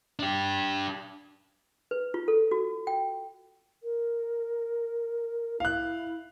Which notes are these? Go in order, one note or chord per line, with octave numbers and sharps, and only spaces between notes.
D4 G4
B4
F4
A4
F#4
G5
A#4
E4 F5 F#6